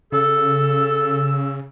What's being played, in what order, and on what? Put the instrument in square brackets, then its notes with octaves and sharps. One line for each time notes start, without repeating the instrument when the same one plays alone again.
[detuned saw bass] C#3 [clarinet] A4 [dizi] E6